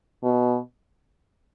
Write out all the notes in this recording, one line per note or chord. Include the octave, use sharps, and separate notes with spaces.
B2